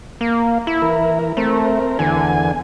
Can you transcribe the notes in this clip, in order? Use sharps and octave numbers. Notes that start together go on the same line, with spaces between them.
A#3
E4
E3 A#4
A3 C4 A#4
E2 D3 G#5